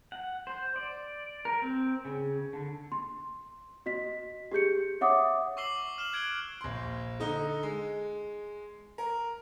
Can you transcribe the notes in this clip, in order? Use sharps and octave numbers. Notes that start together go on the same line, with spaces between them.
F#5
C5
D5
A#4
C4
C#3
D3
C6
F#4 D#5 B6
G4 G#4 G6 C#7
C#5 E5 F#5 D6 D#6
C#6 D6 E6 C7 F#7 G7
F6 E7 F#7 G7
F#6 G#6 D7 F#7 G7
A#1 C6
D3 D#4
G#3
A#4